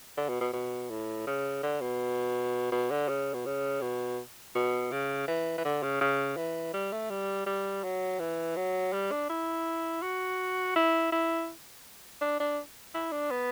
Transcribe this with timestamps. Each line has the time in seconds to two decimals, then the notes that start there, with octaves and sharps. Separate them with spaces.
0.17 D3
0.29 B2
0.41 B2
0.53 B2
0.90 A2
1.27 C#3
1.63 D3
1.81 B2
2.72 B2
2.91 D3
3.09 C#3
3.34 B2
3.46 C#3
3.81 B2
4.55 B2
4.92 C#3
5.28 E3
5.58 E3
5.65 D3
5.83 C#3
6.01 C#3
6.37 E3
6.73 G3
6.92 A3
7.10 G3
7.46 G3
7.84 F#3
8.19 E3
8.56 F#3
8.93 G3
9.11 D4
9.29 E4
10.02 F#4
10.76 E4
11.12 E4
12.21 D4
12.40 D4
12.94 E4
13.12 D4
13.31 B3